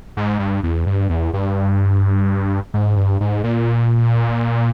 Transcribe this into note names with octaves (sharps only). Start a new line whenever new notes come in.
G#2
G2
E2
G2
E2
G2
G#2
G2
G#2
A#2